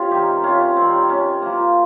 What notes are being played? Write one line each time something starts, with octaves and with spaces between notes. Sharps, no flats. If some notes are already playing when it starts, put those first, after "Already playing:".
Already playing: C3 C#4 F4
D#3 G3 D#4 G4
C3 C#4 F4
C#4
D#3 G3 C4
C#4
C3 C#4
F3 A#3